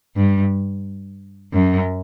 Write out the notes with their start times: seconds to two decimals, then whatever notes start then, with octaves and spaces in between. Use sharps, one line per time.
0.16 G2
1.53 F#2